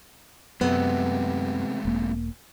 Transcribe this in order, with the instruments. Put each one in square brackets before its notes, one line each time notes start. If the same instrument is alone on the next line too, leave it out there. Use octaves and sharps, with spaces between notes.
[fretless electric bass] F#2 [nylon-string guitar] C3 B3 [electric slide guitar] G#3 A3 C4
[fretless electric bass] E1 A#3